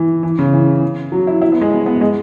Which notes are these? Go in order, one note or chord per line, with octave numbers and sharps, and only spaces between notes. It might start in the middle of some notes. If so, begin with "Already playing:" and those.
Already playing: E3
E3
C#3
E3
F#3
E4
E4
B3
G#3
B3
B3
G#3